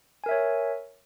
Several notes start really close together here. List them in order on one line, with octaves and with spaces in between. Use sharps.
G#5 A#4 E5 C#5